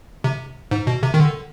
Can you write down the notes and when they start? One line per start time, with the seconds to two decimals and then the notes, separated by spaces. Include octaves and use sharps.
0.24 C3
0.71 G#2
0.87 B2
1.03 C3
1.14 D#3
1.20 D3